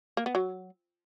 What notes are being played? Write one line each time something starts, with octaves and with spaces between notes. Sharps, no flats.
A#3
B3
F#3